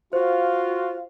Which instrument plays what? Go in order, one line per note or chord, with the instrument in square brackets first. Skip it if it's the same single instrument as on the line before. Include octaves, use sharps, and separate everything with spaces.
[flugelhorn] F4 [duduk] F#4 [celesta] C5 [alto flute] F5